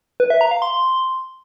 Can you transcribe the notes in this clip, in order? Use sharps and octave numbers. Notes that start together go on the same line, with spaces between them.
B4
E5
A#5
F5
C6